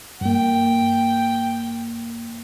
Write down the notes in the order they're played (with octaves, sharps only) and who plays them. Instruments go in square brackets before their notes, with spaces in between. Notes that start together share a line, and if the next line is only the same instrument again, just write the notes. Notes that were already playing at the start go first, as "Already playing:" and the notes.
[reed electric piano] G2 A#3 [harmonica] G5